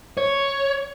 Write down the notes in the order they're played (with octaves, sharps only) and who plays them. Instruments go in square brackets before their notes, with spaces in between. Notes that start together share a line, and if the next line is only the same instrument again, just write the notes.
[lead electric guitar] C#5